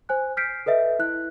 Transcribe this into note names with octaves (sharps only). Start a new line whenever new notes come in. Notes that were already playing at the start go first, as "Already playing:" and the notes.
C5 G#5 F#6
F6 G6 B6 C7 D7
A4 B4 D#5 E5
E4 F#6